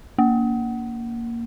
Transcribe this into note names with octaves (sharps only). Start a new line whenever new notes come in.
A#3